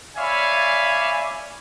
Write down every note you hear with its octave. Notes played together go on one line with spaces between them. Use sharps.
C#5 D5 E5 F5 G#5 B5